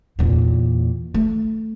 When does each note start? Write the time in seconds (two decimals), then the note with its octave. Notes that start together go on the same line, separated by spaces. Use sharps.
0.19 E2 A#2
1.14 A3